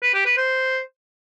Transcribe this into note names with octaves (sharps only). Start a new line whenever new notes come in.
B4
G4
B4
C5